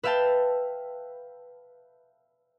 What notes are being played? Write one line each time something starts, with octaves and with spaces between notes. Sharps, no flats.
B4 E5 F5 G5 A5